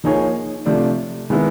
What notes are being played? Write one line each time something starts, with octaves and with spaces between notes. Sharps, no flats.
F3 A#3 D#4 G#4 C#5
C3 F3 A3 D4
D#3 G#3 B3 E4